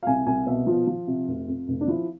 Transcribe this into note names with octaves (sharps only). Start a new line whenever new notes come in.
F5
C2 G#5
C2 G#5
B2 E5
F3 F4
F3
C3
F1
F2
F1
D4
F3 E4